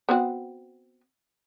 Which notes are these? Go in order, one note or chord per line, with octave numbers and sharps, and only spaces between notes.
B3 C4 F#4